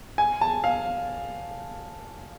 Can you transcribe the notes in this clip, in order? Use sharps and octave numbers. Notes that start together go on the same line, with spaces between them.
G#5
A5
F5